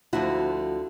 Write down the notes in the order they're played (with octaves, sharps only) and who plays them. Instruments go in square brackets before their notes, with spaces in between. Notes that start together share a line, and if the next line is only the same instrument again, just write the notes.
[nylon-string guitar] D2 D3 F3 E4 F#4